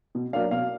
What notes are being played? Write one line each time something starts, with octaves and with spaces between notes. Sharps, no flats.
B2
F#3 A#3 D4 F5
B2 F5